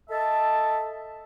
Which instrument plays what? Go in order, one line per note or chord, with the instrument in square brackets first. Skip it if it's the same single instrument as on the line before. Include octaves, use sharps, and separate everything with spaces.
[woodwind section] A4 D#5 E5 A5